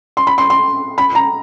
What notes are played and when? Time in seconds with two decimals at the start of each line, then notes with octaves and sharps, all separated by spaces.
0.17 C6
0.27 B5
0.38 C6
0.50 C6
0.98 B5
1.15 A#5